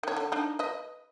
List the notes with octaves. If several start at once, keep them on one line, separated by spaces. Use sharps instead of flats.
D#3 C#5
D3
D4 D#4
B4 D#5